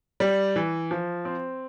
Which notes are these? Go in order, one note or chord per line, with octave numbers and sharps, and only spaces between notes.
G3
E3
F3
C4